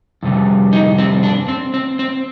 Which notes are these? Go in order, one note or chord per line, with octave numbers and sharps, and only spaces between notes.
F2 C3 G3
D#4
C4
D4
C4
C4
C4